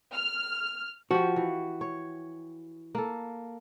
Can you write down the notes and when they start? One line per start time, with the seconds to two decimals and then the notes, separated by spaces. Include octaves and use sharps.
0.13 F6
1.11 F3 F#4 G4
1.36 E3
1.81 C#5
2.95 A#3 A4